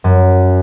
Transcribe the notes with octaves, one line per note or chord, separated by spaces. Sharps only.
F#2